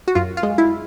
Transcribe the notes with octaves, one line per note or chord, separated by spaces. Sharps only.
F#4
F#2 F4
F4
G#3
E4